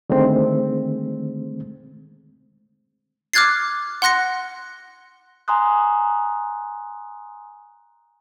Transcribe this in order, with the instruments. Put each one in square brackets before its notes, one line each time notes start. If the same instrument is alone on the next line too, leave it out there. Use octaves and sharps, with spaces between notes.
[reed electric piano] D3 D#3 G#3 A3 C4
[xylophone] D6 F6 F#6 G#6 A6 C7
F#5 C6 F#6 A#6 C#7
[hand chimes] G#5 A#5 C6 D#6 F#6